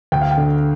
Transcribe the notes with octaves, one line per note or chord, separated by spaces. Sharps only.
D2 G5
F5
G5
D3